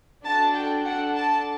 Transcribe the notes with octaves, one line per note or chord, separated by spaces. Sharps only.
D4 F#4 A4 A5
G5
D4 A4 F#5
A5